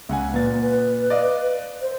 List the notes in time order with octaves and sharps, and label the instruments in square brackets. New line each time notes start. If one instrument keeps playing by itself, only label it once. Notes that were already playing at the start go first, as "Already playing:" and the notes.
[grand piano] C#2 F#5 G#5
[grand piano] A#2 A6 [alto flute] B4
[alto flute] B4
[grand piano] D5 D#5 F5
[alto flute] C5